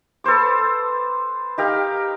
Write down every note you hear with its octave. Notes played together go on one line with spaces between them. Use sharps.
A4 B4 C5 D6
D#4 G4 A#4 F5